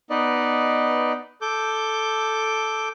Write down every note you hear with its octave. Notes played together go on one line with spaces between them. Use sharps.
B3 D#4 B4 D5 D#5
A4 D6 G6